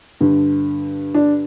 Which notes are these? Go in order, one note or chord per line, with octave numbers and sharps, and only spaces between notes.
G2 D3
D4